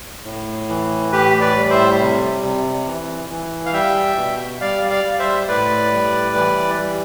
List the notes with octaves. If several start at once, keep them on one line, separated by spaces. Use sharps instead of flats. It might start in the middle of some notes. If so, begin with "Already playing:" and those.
A2
E3
A2 G4 B4
B4 D5
G3
C5 E5
C3
C3
E3
E3
F5
G3 E5 G5
B2
G3 D5 F5
D5 F5
G3
C5 E5
A2 B4 D5
G3
E3
G3